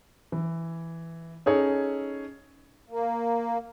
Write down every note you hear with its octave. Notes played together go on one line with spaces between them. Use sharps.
E3
C#4 D#4 G#4 A4 C#5
A#3